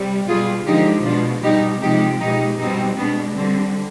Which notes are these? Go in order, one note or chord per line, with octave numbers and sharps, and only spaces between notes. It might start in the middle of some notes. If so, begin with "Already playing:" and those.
Already playing: C3 G3
B2 G3 F4 G#4
D3 F3 G#3 D#4 G4
B2 G#3 D4 F4
B2 G3 D#4 G4
C3 F3 G#3 D#4 G4
B2 G#3 D#4 G4
B2 G3 C4 D#4
B2 G#3 B3 D4
D3 G3 C4